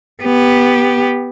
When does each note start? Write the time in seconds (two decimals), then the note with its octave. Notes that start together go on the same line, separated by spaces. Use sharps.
0.23 B3 G4